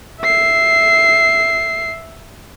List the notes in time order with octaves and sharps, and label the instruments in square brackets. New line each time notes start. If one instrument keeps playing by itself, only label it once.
[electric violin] E5 C7